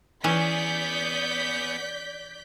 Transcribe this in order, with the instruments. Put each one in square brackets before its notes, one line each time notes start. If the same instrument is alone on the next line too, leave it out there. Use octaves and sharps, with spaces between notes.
[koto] E3 C#4 [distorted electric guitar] B3 G#4 [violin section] D5 G6 B6